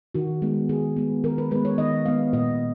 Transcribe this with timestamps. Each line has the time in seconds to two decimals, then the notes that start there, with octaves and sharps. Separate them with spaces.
0.15 D#3 F#4
0.42 G#3 B3
0.69 D#3 G#4
0.96 G#3 B3
1.24 D#3 A#4
1.38 B4
1.51 G#3 B3 B4
1.65 C#5
1.78 D#3 D#5
2.06 G#3 B3 F5
2.33 A#2 D#5